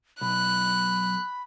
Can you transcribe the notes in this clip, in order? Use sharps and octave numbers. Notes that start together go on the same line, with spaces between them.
B1 B5 F#6